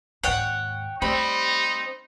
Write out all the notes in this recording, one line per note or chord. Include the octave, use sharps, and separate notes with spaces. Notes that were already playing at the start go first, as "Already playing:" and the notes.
D#2 G#2 C#5 F#5 G5
G3 A3 C4 D#4 B5